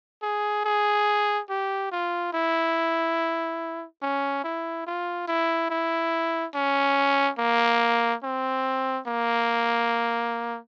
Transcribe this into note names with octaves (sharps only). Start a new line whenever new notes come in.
G#4
G#4
G4
F4
E4
C#4
E4
F4
E4
E4
C#4
A#3
C4
A#3